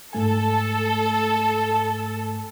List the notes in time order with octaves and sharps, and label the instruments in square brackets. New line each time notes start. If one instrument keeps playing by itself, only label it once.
[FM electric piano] G#2 A3 G#5 [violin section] A4